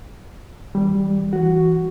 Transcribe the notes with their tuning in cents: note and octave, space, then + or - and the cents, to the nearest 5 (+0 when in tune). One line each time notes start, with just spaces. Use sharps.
E3 -45 G3 +0
E3 +0 F#4 +5